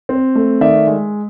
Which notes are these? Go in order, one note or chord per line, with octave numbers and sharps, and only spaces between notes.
C4
A3
D#3 D5 E5
G#3